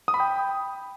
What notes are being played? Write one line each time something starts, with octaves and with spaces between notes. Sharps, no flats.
D#6
B5
G5